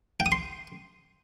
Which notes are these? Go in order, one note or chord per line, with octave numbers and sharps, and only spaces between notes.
G5
D#6
C6